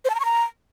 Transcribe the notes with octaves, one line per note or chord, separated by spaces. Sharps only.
C5
A5
A#5
C#6
A#5